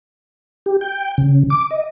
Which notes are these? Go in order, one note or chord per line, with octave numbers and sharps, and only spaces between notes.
G4
G5
C#3
D6
D#5